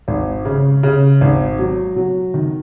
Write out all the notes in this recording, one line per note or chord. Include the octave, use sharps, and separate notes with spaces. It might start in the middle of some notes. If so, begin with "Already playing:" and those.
G#1
C#3
C#3
G#1
F#3
F#3
D#3